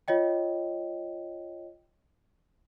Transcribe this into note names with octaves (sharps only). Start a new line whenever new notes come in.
F4 C#5 D#5 G5